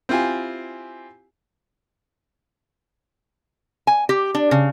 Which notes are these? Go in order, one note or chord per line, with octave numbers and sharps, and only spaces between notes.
C4 E4 F4 G4 G#5
G#5
G4
D4
C#3